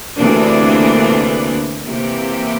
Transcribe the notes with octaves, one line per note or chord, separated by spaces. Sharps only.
D2 C3 E3 A#3 D4
C3 E3 A#3 E4 G4